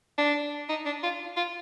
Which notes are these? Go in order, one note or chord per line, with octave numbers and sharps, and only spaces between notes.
D4
D#4
D4
F4
F4